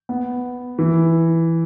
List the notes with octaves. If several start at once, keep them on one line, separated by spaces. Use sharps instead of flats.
B3
E3